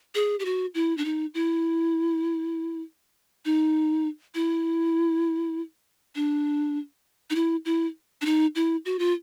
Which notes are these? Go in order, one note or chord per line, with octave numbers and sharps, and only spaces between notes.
G#4
G4
F#4
E4
D4
D#4
E4
D#4
E4
D4
D#4
E4
E4
D4
D#4
E4
F#4
F4